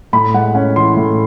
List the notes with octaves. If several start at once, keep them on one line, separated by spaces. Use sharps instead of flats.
A2 B5
G#3 F#5
C#4 F#5
E3 C6
A2